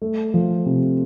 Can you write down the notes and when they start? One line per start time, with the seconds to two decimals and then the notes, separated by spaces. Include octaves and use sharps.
0.02 A3
0.34 F3
0.66 C3